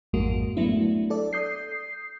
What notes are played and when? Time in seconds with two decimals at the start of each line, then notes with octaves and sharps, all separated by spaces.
0.13 A1 F2 G#2 G#3 A#3 F#4
0.56 F#3 A3 B3 D4 E4 F#4
1.10 A4 D5
1.33 D#6 G6 C7